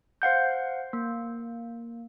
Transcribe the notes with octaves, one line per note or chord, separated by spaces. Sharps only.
C5 F5 F#5 G6
A#3